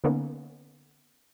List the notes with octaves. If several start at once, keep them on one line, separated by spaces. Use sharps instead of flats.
D3 A#3 B3 C#4 D#4